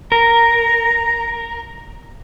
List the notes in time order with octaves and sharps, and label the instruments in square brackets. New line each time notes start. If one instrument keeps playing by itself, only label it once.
[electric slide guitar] A#4 [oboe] A#5